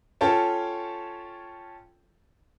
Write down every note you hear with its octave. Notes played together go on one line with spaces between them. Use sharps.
C#4 F4 A4 C#5 G5 A5